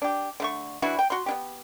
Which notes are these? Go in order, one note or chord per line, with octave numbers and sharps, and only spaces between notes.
D4 G4
D3 A3 C#6
E3 D4 E4 F#4
G5
F#4 C6
B3 D4 G4